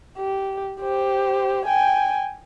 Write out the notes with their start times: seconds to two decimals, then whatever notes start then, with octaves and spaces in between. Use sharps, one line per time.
0.18 G4
0.81 G4 C5
1.65 G5 G#5